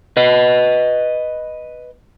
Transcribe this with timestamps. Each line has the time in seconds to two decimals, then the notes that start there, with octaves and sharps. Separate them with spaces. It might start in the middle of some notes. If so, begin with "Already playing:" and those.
0.17 B4 D#5